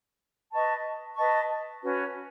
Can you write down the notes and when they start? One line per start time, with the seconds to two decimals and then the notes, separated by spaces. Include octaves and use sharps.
0.52 B4 D#5 A5 C#6
1.16 B4 D#5 A5 C#6
1.81 C#4 F#4 B4